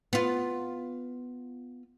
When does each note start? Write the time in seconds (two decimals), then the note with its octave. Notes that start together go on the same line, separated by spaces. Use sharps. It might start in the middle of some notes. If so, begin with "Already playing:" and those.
0.13 B3 F4